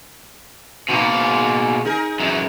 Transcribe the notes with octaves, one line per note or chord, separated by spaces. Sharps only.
B2 A#3 B3 D#4
G#2
D#4 G#4 A#4
F#2 E3